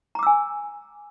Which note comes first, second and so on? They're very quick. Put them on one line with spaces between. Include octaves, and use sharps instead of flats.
A#5 D6 E6 G#5